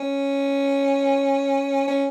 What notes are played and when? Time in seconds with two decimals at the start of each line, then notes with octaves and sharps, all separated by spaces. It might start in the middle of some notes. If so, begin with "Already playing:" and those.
Already playing: C#4
1.88 C#4